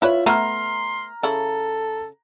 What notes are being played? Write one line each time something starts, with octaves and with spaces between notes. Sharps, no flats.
E4 F4 B4 C#5 E5
A3 B3 E4 A#5 C6 F6
C#3 E4 A4